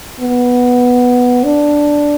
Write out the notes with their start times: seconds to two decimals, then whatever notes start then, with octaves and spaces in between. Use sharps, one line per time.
0.20 B3
1.44 D4